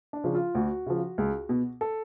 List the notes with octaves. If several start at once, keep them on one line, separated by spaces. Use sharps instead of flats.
D4
C#3 F3
F4
D2 F#4
C#3 F3
C#2
B2
A4